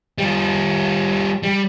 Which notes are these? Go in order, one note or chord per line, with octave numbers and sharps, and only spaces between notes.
G3 F4
G3